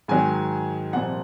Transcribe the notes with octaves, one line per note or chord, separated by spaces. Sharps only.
G#2 D#3 F#3 G#5
C2 A#2 F3 F#5